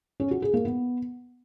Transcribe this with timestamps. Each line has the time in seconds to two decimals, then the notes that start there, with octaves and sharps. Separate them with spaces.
0.20 C#4
0.31 F#4
0.42 G#4
0.54 A#3
0.65 B3